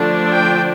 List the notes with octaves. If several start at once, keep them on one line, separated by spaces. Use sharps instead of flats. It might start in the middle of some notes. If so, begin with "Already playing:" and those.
Already playing: D3 F3 A3 D4
G5